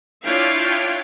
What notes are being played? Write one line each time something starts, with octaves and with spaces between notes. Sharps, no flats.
D4 E4 F4 C#5 F5 G5